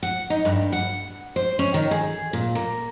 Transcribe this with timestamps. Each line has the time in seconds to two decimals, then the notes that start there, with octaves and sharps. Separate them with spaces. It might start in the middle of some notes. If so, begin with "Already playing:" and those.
0.03 F#5
0.30 D#4
0.45 G2
0.72 F#5
1.36 C5
1.59 C#4
1.74 D#3
1.91 G#4
2.33 A#2
2.55 A#3